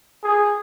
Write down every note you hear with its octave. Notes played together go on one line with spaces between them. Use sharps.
G#4